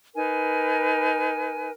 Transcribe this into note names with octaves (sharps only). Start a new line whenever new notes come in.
D#4 A#4 B4 G#5